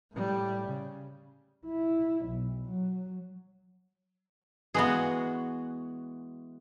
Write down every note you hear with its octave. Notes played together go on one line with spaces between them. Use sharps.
A2 G3
C#3
E4
B1
F#3
E3 G#3 B3 F#4 G#4